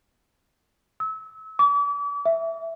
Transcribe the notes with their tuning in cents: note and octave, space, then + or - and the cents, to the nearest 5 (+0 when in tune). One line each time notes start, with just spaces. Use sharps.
E6 -30
D6 -40
E5 +0